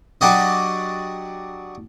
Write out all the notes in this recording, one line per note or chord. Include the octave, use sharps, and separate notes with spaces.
F#3 D4 F#4 G4 D5 D#5